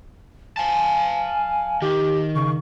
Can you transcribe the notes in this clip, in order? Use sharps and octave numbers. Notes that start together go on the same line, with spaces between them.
F5 G#5 A5
D#3 G4
C#3 C#6